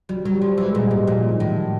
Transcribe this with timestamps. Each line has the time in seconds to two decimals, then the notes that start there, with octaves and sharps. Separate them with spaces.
0.09 F#3 G3
0.25 F#3 G3
0.42 F3
0.58 E3
0.66 G#3
0.75 A#2
0.80 G3
0.91 G#2 F#3
1.07 A#2 F3
1.28 D#3
1.40 A2
1.50 D3